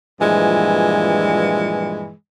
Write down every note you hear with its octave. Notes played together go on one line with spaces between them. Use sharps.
G2 A#2 E3 F3 G#3